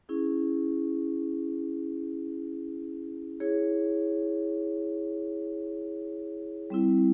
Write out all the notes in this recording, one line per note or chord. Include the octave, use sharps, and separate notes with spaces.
C#4 E4 G#4
E4 G#4 C#5
G3 C4 E4